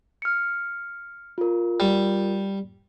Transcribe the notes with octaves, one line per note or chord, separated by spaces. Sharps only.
F6 C#7
F4 A#4
G3